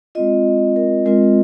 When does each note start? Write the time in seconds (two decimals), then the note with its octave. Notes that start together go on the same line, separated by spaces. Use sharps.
0.15 G#3 C4 F4 D#5
0.76 A#4
1.06 G#3 C4 F4 A#4